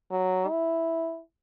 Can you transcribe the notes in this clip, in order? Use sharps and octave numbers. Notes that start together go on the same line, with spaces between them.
F#3
E4